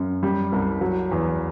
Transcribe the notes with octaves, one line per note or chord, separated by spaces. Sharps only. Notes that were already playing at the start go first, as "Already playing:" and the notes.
Already playing: F#2
G3
C2
F#3
E2